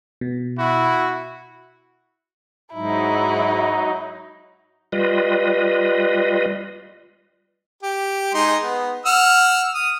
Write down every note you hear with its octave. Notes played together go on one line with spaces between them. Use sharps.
B2
E4 F#4
G#2 F#3 D#4 E4
G3 F4 B4 D#5
G4
G#3 D#4 C6
B3
F#5 E6 F6
D#6